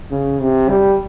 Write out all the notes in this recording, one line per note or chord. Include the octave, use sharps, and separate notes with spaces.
C#3
C3
G3